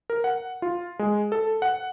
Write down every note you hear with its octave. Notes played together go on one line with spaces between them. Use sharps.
A#4
F#5
F4
G#3
A4
F#5